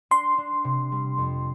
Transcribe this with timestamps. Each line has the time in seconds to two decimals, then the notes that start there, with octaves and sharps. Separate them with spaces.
0.11 D4 C6
0.38 D4
0.64 C3
0.92 G3
1.18 F2